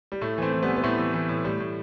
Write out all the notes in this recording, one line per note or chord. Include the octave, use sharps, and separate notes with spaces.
G3
A2 A3
E3 A3 C4
E3
G3 B3
E3
B3
A2 A3
E3
E3
A2
A2 G3
A2